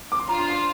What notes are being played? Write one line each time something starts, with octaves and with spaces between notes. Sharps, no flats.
D6
C6
D4 F4 C5 F5 A#5
C6
C6